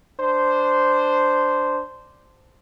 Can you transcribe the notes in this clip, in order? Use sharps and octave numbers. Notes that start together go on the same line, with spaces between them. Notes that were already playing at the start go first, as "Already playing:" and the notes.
D4 C5